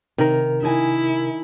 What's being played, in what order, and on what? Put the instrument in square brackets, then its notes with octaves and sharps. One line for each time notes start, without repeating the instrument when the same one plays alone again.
[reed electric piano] C3 A#4 [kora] D#3
[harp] D#4 G#5 [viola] E4